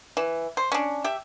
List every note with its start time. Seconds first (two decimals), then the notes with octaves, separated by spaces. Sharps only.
0.17 E3
0.57 C5
0.72 C#4 D4
1.04 G4 E5